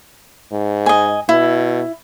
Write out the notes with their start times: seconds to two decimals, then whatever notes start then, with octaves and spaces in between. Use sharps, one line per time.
0.52 G#2
0.86 D#5 G#5
1.29 B2 E4